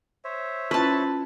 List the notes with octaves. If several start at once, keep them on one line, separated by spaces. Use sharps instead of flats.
C5 C#5 E5
C#4 E4 F4 B4 A5